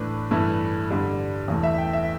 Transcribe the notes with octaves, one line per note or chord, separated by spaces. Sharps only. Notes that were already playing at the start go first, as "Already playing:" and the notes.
Already playing: A2 E3 A3 D4 B4
G2 E3 A3 E4
G2 D3 G3
E2 E3 A3
E5
G5
E5